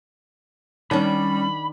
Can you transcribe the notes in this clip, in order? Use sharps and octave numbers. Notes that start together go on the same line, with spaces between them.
D#3 G3 C#4 D4 G5 B5